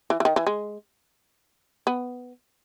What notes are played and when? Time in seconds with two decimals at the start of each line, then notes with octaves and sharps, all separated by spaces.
0.10 E3
0.20 E3
0.25 D#3
0.36 E3
0.47 G#3
1.87 B3